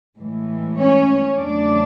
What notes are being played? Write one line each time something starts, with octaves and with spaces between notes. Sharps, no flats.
A2 E3 G#3
C#4 C#5
E2 C#3 F#3 A3 D4 D5